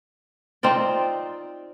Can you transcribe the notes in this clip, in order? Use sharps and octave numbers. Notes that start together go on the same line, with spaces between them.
C4 D#4 F4 D5